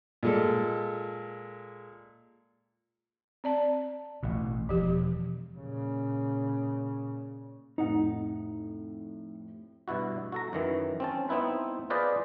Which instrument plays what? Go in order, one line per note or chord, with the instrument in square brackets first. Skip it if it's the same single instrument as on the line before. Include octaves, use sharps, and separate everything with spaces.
[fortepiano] A#2 G#3 A4
[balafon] C4 D5 A5
[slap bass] A1 B2
[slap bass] E1 [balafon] F3 G4
[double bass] A#2 C#3
[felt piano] F2 A2 C3 [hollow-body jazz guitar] D#4 F#5
[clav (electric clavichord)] G2 B2 E4 F#4
F#4 A4 A#5
F#2 D#3 E3
C4 C#4 A5
B3 C4 D#4 E4 B4
F4 G#4 B4 C5 D5 D#5